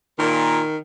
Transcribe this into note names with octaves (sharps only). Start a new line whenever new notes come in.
A#2 D#3